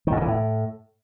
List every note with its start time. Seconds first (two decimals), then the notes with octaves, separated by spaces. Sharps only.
0.07 D#3
0.12 G#2
0.17 C3
0.22 E3
0.27 A2